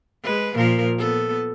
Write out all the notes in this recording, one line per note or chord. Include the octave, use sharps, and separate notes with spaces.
G#3 B4
A#2 F3 A#4
B3 A4